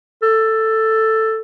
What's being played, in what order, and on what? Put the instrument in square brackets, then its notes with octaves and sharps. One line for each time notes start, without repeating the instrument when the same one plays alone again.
[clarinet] A4